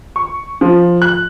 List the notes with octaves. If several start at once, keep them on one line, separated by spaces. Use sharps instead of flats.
C#6
F3
F#6